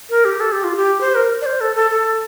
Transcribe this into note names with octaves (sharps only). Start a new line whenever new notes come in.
A#4
G4
A4
G4
F4
G4
C5
A#4
D5
C5
A4
A4
A4